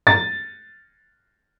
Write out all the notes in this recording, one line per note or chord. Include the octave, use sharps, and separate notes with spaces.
A6